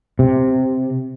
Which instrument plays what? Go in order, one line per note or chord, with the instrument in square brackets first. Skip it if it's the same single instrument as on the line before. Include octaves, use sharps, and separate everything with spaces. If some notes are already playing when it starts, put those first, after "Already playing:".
[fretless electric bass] C3